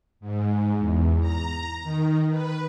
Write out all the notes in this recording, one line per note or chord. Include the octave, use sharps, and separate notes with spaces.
G#2
E2
A#5
D#3
B4